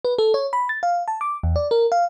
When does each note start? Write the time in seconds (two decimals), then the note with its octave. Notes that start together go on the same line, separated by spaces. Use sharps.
0.05 B4
0.18 A4
0.34 C#5
0.53 B5
0.69 A6
0.83 F5
1.08 A5
1.21 D6
1.43 E2
1.56 D5
1.71 A#4
1.92 F5